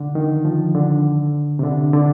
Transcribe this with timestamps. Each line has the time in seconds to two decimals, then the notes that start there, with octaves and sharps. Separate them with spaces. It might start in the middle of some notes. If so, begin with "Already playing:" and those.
Already playing: D3
0.15 D#3
0.45 F3
0.75 D3
1.59 C3
1.63 D3
1.93 D3